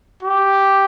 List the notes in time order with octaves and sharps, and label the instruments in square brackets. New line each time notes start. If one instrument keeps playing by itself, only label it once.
[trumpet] G4